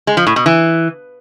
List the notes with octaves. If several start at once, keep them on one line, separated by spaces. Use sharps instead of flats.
G#3
F3
A2
B2
E3